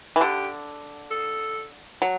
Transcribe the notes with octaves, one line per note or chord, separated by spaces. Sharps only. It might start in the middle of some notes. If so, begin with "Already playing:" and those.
E3
D3 G4
A4
F#3